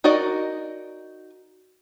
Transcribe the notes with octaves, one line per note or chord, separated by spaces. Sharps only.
D#4 F#4 A#4 D5 D#5